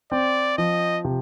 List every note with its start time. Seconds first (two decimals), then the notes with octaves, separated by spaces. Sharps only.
0.11 C4 D5
0.58 F3 D#5
1.05 C3